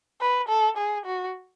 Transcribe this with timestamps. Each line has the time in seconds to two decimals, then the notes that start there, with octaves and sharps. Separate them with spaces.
0.21 B4
0.49 A4
0.77 G#4
1.06 F#4